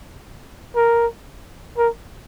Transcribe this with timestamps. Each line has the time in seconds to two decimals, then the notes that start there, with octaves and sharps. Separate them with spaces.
0.75 A#4
1.78 A#4